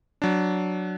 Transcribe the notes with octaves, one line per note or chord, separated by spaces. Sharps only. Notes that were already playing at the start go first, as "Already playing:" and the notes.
F#3 D4